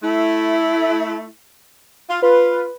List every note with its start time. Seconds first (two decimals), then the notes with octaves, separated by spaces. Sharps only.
0.02 A3 E4
2.10 F4
2.22 F4 B4